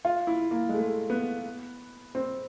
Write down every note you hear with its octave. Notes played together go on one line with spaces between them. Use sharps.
F4
E4
A#3
G#3
A3
B3
C4